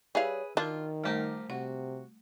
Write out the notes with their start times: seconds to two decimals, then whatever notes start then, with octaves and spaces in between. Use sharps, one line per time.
0.15 G3 G#4 B4 C#5 E5 F5
0.57 D#3 D4 F4 F#4 A#4
1.04 F3 G3 A3 G4 A#4
1.50 C3 F#4 F#5